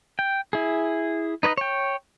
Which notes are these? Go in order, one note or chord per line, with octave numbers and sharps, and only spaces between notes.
G5
E4 G#4
D#4 B4 C#5 D#5
C#5 G5